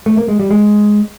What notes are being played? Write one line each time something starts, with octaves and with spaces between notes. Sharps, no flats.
A3
A#3
G#3
G3
G#3